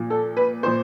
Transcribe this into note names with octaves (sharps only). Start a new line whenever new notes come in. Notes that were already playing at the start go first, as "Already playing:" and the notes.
Already playing: A#2 F3
A4
B4
A#2 F3 C5